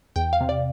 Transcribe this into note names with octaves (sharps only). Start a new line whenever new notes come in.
E2 G5
F5
C3
D5